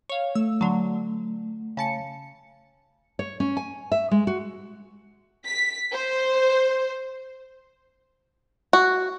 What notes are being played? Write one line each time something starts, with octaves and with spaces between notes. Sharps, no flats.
C#5 F5
A3 E6
D3 F#3
C#3 A5 C#7
C#5
C#4
G#5
E5
G#3
F#4
B6
C5
F#4